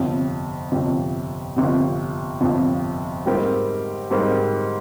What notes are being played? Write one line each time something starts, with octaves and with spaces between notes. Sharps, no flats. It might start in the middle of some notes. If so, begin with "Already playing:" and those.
Already playing: G1 F2 C3
G1 F2 C3
G1 F2 C3
G1 F2 C3
G#2 G3 C4 G4 A#4
G#2 G3 C4 G4 A#4